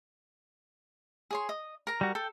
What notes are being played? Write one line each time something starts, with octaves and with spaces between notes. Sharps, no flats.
G#4 C#5 C6
D#5
A#4 A#5
G3 F#4
A4 G5